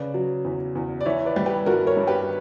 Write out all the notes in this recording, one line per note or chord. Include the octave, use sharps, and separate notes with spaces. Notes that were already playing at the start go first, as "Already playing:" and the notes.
Already playing: C#3 B4 D5
F#3
E2
E2
D5
E3 C#5 E5
B4 D5
G3
G4 B4
G2 F#4 A#4
A#4 C#5
G2
G4 B4